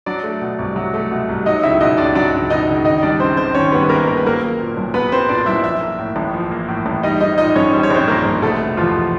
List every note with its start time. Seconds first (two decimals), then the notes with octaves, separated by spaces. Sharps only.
0.06 F#3 D4 D5
0.24 A3
0.41 B2
0.59 C2
0.76 F#3
0.94 A3
1.11 B2
1.29 C2
1.46 F#3 D#4 D#5
1.63 C#2 E4 E5
1.81 B2 D#4 D#5
1.98 C#2 D4 D5
2.15 F#3 D4 D5
2.33 C#2
2.50 B2 D#4 D#5
2.68 C#2
2.85 D#3 D#4 D#5
3.02 G3 D4 D5
3.20 F#2 C4 C5
3.37 G#1 C4 C5
3.55 D#3 C#4 C#5
3.72 G3 B3 B4
3.83 B4
3.89 F#2 A#3 A#4
4.07 G#1 A#4
4.17 B4
4.24 F#3 A#3 A#4
4.42 A#3
4.60 A#2
4.77 B1
4.94 F#3 B3 B4
5.11 A#3 C4 C5
5.29 A#2 D4 D5
5.46 B1 E4 E5
5.64 F3 E4 E5
5.81 A#3
5.99 A2
6.16 A1
6.33 F3
6.51 A#3
6.68 A2
6.86 A1
7.03 G3 D#4 D#5
7.20 A#1 D#4 D#5
7.38 A#2 D#4 D#5
7.55 A#1 C#4 C#5
7.73 G3 C5
7.83 C#5
7.90 A#1 C4 C5
8.08 A#2 A#3 A#4
8.25 A#1
8.42 B2 A3 A4
8.60 F1
8.77 E2 F3 F4